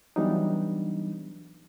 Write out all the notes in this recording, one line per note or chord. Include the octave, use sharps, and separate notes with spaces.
E3 F#3 G3 B3 D4 D#4